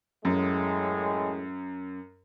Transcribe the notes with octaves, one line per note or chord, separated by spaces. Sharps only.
F#2 A2 G#3